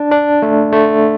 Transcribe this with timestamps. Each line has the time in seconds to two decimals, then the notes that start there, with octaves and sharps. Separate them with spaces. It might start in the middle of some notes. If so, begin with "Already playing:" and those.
Already playing: D4
0.12 D4
0.42 A3
0.72 A3